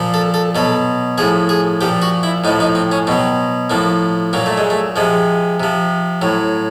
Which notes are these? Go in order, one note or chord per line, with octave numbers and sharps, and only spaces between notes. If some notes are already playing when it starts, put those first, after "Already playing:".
Already playing: A#2 F3
A4
A4
B2 F#3 A4
A2 F3 G#4
G#4
A#2 F3 G4
F#4
E4
A2 F3 D#4
D#4
C4
C#4
B2 F#3 C4
A2 F3 A#3
A#2 F#3 A#3
A3
G#3
A3
C3 F3 G#3
C3 F3
A2 F#3